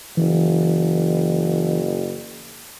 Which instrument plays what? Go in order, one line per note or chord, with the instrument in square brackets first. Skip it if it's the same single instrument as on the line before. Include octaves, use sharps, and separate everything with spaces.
[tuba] F#1 [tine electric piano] E3